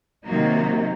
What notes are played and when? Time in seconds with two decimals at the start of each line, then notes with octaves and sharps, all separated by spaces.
0.24 C3 D#3 F#3 A#3 D#4